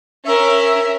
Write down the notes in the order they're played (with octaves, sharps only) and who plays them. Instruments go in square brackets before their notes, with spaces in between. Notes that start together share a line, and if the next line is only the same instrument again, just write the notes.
[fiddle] C#4 A#4 [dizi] E5